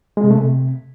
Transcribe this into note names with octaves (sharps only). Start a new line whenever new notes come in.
G#3
C3
A3
C3